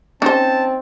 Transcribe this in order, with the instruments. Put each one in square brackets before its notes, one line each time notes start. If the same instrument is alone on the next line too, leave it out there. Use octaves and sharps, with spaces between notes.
[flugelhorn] C4 [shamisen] C#4 C5 [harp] D#4 [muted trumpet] A5